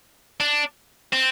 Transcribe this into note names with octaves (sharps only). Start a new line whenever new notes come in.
D4
C4